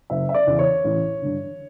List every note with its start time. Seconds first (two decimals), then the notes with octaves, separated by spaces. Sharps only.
0.10 F#1 E5
0.29 E5
0.34 D5
0.47 E2 C#3
0.59 C#5
0.84 A1
1.22 G2 D3